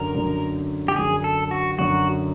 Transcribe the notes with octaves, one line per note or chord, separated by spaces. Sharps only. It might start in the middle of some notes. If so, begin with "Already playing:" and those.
Already playing: F#2 D3 F#3 A#4
F#2 D3 F#3
G4
F#2 D3 F#3 G#4
A4
F#4
F#2 D3 F#3 F#4